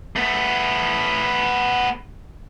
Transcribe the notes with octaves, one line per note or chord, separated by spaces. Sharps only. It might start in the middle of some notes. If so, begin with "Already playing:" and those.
A3 B3